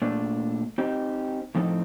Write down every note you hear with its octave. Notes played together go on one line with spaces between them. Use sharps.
A#2 A3 D4
C4 D#4 G4
A2 F3 C4 D#4 A4